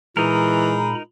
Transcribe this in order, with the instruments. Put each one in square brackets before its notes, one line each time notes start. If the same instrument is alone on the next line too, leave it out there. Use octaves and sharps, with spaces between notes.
[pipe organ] A#2 A#5 B5 [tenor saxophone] E3 [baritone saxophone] G#3 [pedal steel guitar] D#4 A#4